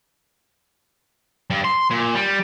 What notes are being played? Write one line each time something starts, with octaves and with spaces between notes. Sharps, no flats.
G2
C6
A#2
G3